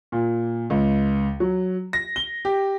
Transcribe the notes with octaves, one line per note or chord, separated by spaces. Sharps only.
A#2
C#2
F#3
A#6
G7
G4